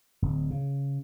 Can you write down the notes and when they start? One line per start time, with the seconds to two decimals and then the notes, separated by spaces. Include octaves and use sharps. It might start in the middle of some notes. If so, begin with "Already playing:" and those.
0.22 D1
0.51 C#3